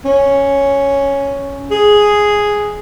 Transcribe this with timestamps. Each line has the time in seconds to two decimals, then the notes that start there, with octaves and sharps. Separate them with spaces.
0.05 C#4
1.71 G#4